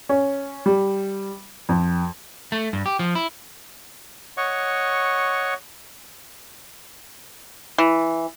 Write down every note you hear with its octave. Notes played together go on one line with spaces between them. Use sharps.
C#4
G3
F2
A3
G2
G4
F3
E4
C#5 D#5 F#5 C#6
E3